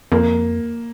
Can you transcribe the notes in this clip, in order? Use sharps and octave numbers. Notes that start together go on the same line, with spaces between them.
F2 A#3